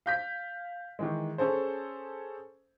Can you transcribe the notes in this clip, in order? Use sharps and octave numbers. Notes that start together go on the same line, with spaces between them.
F5 G6 B6
D#3 E3 G#3
C#4 G#4 A4 C5